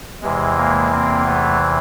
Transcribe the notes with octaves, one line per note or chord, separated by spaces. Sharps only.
E2 C3 E3 G#3
G#3 A#3
A#3 C4
A3 B3